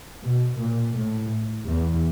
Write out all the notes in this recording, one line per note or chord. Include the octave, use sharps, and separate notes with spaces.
B2
A#2
A2
E2